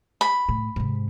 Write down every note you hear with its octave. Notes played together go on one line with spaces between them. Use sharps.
B5
A2
G#2 C3